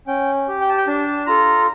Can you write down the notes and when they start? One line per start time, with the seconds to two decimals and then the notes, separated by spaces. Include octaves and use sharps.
0.07 C#4 G5
0.48 G4
0.61 G5
0.69 A5
0.78 G5
0.87 D4 A5
1.27 F4 A4 A#5